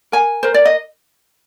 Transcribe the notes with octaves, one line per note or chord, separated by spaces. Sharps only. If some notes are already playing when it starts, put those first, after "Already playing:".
A#4 G#5
A#4 C5
D5
D#5